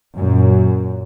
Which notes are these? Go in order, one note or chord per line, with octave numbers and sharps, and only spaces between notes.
F#2 A#2